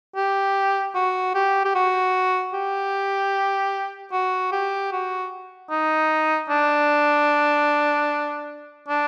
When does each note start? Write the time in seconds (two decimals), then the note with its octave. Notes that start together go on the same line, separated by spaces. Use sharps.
0.16 G4
0.95 F#4
1.35 G4
1.65 G4
1.75 F#4
2.54 G4
4.12 F#4
4.52 G4
4.92 F#4
5.70 D#4
6.49 D4
8.88 D4